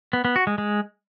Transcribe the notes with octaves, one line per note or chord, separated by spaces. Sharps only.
B3
B3
F#4
G#3
G#3